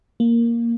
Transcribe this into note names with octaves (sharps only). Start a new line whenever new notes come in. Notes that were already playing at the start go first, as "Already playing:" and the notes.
A#3